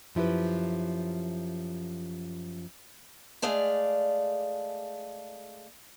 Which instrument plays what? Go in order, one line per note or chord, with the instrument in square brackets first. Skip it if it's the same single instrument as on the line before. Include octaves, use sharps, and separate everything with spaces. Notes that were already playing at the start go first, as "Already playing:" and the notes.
[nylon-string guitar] F#2 F3 E4 G4 B4
[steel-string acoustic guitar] G#3 A3 G#4 D5 F5